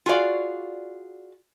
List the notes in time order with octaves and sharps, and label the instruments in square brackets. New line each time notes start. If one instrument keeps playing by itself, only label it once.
[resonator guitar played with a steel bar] F4 F#4 G#4 A#4 D5 F5